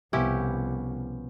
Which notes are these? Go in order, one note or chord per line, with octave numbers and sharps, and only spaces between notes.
C2 B2 F3 C#4 E4 G4